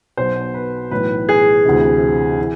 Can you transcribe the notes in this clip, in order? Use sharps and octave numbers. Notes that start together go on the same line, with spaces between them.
B1 B2 C5
B4
B1 A2 E3 B4
G#4
D2 C3 E3
E3